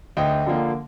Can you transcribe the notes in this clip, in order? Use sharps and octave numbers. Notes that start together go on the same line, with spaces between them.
D2 D#5 G5
D3 F3 A#3